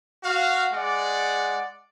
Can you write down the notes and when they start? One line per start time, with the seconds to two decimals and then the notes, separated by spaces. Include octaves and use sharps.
0.24 F#4 F5
0.73 G#3 D5 F#5